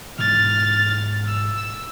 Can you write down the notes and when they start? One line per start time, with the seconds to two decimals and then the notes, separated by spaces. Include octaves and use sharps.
0.19 G#2 B2 E3 F6 A6
1.26 E6